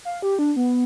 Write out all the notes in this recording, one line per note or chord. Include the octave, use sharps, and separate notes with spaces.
F5
G4
D4
B3